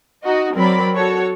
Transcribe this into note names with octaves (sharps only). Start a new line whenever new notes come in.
D#4 F#4 D#5
F#3 C4 A#4 D5 B5
F#4 A4 C#5